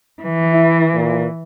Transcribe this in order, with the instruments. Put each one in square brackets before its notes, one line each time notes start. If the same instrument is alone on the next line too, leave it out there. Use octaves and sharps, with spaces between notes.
[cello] E3
[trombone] E4
A#2